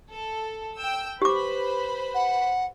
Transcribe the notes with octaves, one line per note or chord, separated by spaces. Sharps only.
A4
G5 E6
G4 B4 C5 B5 D6
F#5